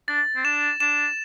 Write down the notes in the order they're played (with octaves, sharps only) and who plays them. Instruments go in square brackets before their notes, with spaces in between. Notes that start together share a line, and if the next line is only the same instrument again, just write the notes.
[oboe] D4 [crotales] A6
[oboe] C4
[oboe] D4 [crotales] E7
[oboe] D4 [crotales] E7